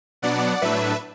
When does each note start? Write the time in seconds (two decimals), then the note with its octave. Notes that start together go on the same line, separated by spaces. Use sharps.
0.22 B2 F#3 B3 D4 D5 F#5
0.62 A2 F#3 A3 D4 B4 E5